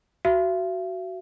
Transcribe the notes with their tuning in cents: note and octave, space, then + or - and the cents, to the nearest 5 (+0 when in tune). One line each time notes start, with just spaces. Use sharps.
F#4 +15 E5 +45